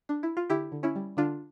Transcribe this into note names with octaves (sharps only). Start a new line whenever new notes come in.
D4
E4
F4
D3 E4 G4
D3
C#4 E4
G3
D3 D4 F4